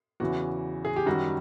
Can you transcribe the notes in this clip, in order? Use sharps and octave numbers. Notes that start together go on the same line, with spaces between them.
E2 C#3 E3 F#4
G#4
G4
F#2 D#3 G3 F#4